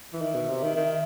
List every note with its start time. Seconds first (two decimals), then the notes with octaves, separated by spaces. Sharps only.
0.13 E3
0.21 D#3 E5
0.35 B2
0.48 C3
0.63 D#3
0.76 D#3